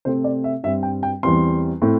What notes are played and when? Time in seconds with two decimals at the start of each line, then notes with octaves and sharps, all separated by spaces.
0.05 C3 A3 C4 C5
0.24 D5
0.44 E5
0.63 G2 G3 C4 E5
0.83 G5
1.03 G5
1.23 E2 E3 G3 C4 C6
1.82 A2 A3 C4